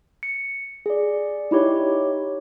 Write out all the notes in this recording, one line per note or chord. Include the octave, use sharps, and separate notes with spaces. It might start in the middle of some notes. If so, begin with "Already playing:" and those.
C#7
G#4 D5
D#4 E4 G4 C#5